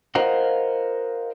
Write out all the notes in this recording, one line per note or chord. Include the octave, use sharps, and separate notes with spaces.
F4 A#4 C5 D#5 F5 F#5